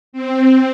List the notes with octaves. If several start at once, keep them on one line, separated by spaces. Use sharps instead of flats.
C4